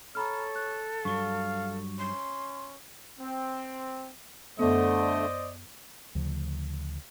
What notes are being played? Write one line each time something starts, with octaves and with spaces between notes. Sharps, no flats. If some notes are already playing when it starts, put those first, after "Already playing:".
A4 C#5 A#5 B5 F6
F#6
G2 F#3 F5 C#6
C#4 C6
C4
F#2 D3 A3 B3 C5 D5 D#5
D2 C#3 F3